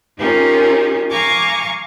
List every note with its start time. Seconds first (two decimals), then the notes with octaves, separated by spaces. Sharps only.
0.18 C#4 D#4 F4 G4 G#4 A#4
1.10 F5 G#5 A#5 C#6 D6